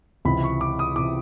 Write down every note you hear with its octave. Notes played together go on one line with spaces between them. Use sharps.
C#2 C3 E3 B5
C#6
D6
D#6
C3 E3 D6